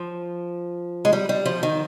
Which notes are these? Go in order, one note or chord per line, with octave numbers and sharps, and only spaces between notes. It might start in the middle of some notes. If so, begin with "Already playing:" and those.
Already playing: F3
G#3
G3
G3
F3
D#3